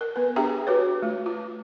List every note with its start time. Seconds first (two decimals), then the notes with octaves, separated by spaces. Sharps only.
0.01 A#4
0.16 B3 B4
0.36 D4 G4 G#4 E5 G5 A#5
0.67 F#4 B4 C#5
1.02 A3 F4
1.26 F4